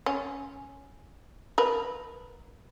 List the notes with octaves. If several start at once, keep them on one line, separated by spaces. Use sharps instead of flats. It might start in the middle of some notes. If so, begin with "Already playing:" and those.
C#4
A#4 B4